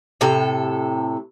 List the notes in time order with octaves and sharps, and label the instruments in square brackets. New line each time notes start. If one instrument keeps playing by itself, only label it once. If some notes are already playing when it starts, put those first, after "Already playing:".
[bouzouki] A2 C3 A4